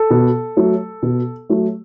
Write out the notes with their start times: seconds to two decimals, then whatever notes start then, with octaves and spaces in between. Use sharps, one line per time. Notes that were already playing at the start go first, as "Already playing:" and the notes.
Already playing: A4
0.10 B2
0.57 F#3 A3
1.02 B2
1.50 F#3 A3